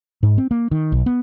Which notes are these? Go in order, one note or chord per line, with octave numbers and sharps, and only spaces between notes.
G#2
C4
A#3
D#3
B1
B3